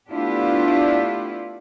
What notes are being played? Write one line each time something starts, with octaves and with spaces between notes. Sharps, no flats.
A3 B3 D4 E4 F4 G4